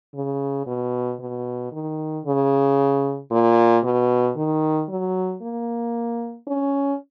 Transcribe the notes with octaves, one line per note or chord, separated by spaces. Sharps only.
C#3
B2
B2
D#3
C#3
A#2
B2
D#3
F#3
A#3
C#4